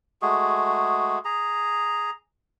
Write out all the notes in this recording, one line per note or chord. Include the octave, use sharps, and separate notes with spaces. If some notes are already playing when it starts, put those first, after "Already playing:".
G#3 A3 F#4 G#4
G#4 A#5